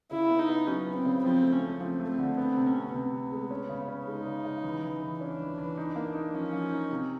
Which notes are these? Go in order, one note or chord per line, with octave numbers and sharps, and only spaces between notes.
C#3 E4
B3
D#4
B3
F#3 C#4
B3
C4
C#3
F3 C4
A3
C#4
A3
F3 C4
A3
C4
D3
B3 C4
C3
C#4
C3
C3 B3
C3
G#3
C#4
C#3
C#4
G#3 D#4
C#3
C#3
E3
E3
E3
C#4 D4
E3
E3
D#4
A#3
D#4
F3 C#4
F3
D#4
C3